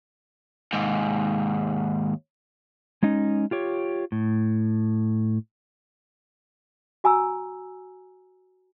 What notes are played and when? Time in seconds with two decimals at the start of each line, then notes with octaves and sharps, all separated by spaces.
0.73 D#2 G#2
3.03 G#3 C#4 D#4
3.51 F4 G4 C#5
4.12 A2
7.04 F#4 G#5 A#5 E6